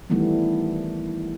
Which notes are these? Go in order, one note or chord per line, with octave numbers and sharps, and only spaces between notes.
D#3 E3 G3 A3 B3